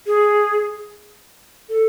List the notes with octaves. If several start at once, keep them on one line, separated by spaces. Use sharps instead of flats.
G#4
A4